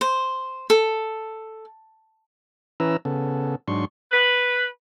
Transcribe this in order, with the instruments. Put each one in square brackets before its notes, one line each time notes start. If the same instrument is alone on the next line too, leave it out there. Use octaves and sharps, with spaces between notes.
[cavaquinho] C5
A4
[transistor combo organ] E3 C#4 E4 B4 A#5 E6
C#3 B3 A4
G#2 F#3 D4 C6 C#6
[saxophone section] B4